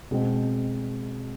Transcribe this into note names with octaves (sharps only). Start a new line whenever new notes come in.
B2 G#3 C4